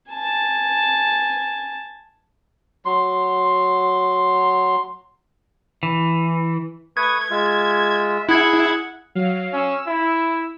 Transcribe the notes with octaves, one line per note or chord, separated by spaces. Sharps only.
G#5 A5
F#3 C6
E3
A3 B4 C#6 D#6 G#6
G#3 F4 E5
E4 G#4 F#5 G#6
F#3 F5
C#4 E6
E4